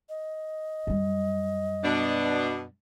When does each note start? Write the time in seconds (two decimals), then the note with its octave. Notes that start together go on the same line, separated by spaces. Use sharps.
0.09 D#5
0.87 F#2 G3
1.84 B2 D4